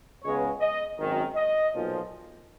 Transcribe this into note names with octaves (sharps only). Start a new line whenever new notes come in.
C#2 C#3 G#3 B3 C#5
D#5
G#1 F#2 D#3
D#5
B1 A#2 F3